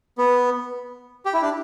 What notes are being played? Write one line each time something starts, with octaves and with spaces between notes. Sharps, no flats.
B3
G4
E4
D4